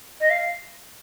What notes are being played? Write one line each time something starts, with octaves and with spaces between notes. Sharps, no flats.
D#5
F5